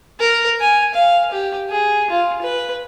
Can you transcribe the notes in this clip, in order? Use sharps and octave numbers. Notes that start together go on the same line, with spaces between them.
A#4
G#5
F5
G4
G#4
F4
B4